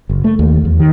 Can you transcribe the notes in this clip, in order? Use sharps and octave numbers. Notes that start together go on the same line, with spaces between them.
F#1
A3
D#2
E2
D#3